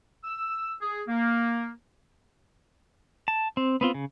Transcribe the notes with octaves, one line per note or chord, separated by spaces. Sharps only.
E6
G#4
A#3
A5
C4
B3 C4 F4
C#3